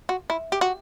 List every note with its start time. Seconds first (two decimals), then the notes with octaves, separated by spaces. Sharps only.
0.09 F#4
0.30 E4
0.52 G4
0.61 F#4